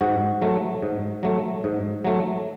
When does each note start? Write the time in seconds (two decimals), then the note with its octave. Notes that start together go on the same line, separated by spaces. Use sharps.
0.01 G#2 F#4
0.42 F#3 A3
0.82 G#2
1.23 F#3 A3
1.64 G#2
2.04 F#3 A3